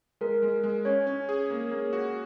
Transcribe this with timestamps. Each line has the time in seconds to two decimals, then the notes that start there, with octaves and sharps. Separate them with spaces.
0.21 G#3 A#4
0.43 G#3
0.64 G#3
0.85 C#4 C#5
1.07 C#4
1.29 G#4
1.50 A#3
1.71 A#3
1.93 F#4